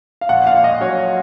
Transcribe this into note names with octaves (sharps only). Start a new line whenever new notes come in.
F5
A#1 F#5
A#2 F5
A#1 D#5
F#3 C#5